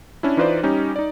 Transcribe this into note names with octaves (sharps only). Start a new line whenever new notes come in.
C#4 D4 E4
E3 D#4 F4 B4 C5 D5
G3 C#4 D#4 G4
D#4 D5